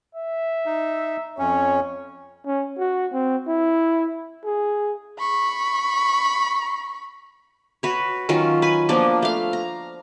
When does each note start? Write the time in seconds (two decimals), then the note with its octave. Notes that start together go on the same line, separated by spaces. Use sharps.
0.15 E5
0.66 D#4
1.39 F2 C#4 C#5
2.46 C#4
2.78 F#4
3.13 C4
3.48 E4
4.45 G#4
5.19 B5 C#6
7.83 F#4 B4 C#5
8.29 D#3 F#3 C#4 F4
8.62 B4 G#5
8.89 F3 A#3 B3 D4
9.22 A3 F5
9.53 A#5